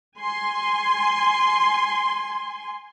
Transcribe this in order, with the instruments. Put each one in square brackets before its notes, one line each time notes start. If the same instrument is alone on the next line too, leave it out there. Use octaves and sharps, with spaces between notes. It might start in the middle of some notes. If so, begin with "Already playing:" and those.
[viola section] G#5 C6